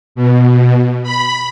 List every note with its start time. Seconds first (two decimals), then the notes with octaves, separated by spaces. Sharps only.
0.15 B2
1.03 B5